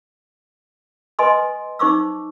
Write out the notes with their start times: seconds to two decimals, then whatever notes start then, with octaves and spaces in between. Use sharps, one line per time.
1.19 B4 D#5 G#5 C6 D#6
1.79 D#4 C5 C#6 D6 E6